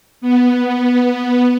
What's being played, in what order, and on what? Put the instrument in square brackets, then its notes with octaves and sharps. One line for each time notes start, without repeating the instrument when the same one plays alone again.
[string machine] B3